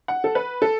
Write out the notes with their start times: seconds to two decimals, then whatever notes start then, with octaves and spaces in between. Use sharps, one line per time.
0.08 F#5
0.24 A4
0.35 B4
0.62 A4